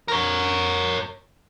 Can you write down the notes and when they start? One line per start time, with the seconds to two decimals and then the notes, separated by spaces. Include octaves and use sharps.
0.08 A#4 C#5